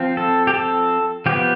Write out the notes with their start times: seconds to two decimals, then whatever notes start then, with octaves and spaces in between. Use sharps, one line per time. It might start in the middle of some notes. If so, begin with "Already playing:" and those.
Already playing: F3 C4
0.17 A4
0.47 G4
0.54 A4
1.26 F3 B3 G4